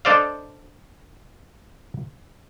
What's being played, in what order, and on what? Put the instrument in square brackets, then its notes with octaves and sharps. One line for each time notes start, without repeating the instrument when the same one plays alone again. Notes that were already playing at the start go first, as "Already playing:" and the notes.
[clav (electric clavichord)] D4 A4 C5 D5 D#5 F5